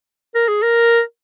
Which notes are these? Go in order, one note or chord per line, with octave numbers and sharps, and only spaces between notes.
A#4
G#4
A#4